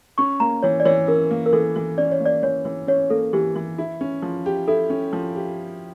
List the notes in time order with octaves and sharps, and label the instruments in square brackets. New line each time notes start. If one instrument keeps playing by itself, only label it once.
[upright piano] C#4 [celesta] C#6
[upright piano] A#3 [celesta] A#5
[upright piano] E3 [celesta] C#5
[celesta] D5
[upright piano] E3 [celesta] C#5
[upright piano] C#4 [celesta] A#4
[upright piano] A#3
[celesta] A#4
[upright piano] E3 [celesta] A4
[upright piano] E3
[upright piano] C#4 [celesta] D5
[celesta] C#5
[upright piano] A#3
[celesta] D5
[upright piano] E3 [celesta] C#5
[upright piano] E3
[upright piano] C#4 [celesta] C#5
[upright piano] A#3 [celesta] A4
[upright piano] E3 [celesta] G4
[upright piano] E3
E4
C#4
F3
G4
[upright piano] E4 [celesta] A4
[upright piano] C#4
F3
G4